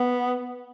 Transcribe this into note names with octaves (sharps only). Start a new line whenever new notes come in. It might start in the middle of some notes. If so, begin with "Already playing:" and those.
Already playing: B3